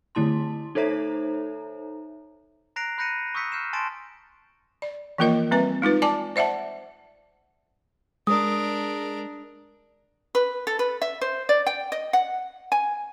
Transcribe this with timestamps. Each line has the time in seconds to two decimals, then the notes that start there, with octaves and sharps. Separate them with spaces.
0.15 D3 A3 E4 A5 C6
0.75 D#4 A4 C5 C#5 E5 A#5
2.76 A#5 F#6 A#6 C7 D7 F7
2.98 B5 F#6 G6 A#6 C#7 D#7
3.35 C#6 D#6 E6 G6 B6 C#7
3.52 F6 G6 C7 E7
3.73 G#5 A5 C6 A6 D7 E7
4.82 D5
5.18 E3 F3 A#3 F4 A#4 D#5
5.51 G3 C4 B4 G#5
5.82 G#3 D#4 F4 B4
6.02 D5 G#5 A5 D6
6.36 C5 D5 E5 F#5 A5
8.27 G#3 D4 A#4 D#6
10.35 B4
10.67 A4
10.79 B4
11.02 E5
11.21 C5
11.49 D5
11.67 G5
11.92 D#5
12.13 F#5
12.72 G#5